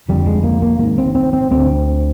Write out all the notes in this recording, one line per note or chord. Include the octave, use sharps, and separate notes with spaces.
F1 F2 D3 G3
G#3
A#3
A#3
G#1 G#2 A#3
C4
C4
C4
D2 D3 C4